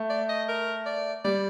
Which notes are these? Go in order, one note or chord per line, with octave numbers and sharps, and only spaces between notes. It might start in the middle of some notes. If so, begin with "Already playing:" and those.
Already playing: A3
D5
D#5
A#4
D5
G3 D5